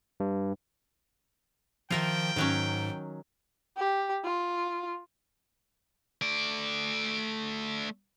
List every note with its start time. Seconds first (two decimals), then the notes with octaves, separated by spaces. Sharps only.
0.20 G2
1.91 D#3 F3 F4 A#4 E5 G5
2.36 G#2 D#3 F#3 C#4
3.77 G4
4.24 F4
6.22 A3 D5